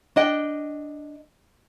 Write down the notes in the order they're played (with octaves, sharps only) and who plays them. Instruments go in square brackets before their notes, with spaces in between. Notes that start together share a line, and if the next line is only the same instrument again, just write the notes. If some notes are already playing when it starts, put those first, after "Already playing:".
[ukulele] D4 D#5 G5